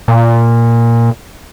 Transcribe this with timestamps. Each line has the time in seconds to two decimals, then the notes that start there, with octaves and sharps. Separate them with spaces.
0.08 A#2